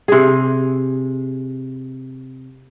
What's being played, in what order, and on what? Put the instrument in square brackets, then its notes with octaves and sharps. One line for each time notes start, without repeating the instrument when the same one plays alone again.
[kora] C3 G#4